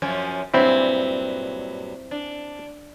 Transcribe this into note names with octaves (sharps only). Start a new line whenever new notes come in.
F#2 F3 C#4
G2 A#2 F#3 C4 E4
D4